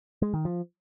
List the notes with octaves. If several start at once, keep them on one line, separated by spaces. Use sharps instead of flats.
G#3
D#3
F3